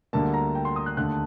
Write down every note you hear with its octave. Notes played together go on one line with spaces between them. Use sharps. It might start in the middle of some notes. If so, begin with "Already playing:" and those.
D2 D3 G3 A#3 A5
A#5
G5
C6
D#6
F#6
D#2 D3 A3 F#6